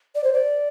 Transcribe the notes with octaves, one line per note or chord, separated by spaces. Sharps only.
D5
C5
D5